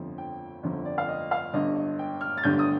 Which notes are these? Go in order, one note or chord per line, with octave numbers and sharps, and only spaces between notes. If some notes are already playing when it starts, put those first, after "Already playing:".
Already playing: G1 F2 D3 F3
G5
G1 F2 D3 F3
D5
F5
D#5
F5
G1 G2 D3 D#5
D#5
G5
F6
A6
G1 G2 D3 G6
D#6